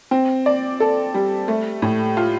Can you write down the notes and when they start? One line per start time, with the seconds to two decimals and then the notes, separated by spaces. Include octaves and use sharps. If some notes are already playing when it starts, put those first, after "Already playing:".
0.11 C4
0.46 D5
0.80 A4
1.14 G3
1.48 A3
1.82 A2
2.17 F4